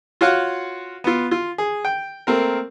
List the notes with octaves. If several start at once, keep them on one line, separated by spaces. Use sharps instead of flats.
F4 F#4 C#5 F5 F#5
B3 F4
F4
G#4
G5
A3 A#3 C4 A#4